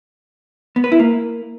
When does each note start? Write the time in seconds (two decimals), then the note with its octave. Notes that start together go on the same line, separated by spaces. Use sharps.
0.76 B3
0.84 B4
0.92 E4
0.99 A#3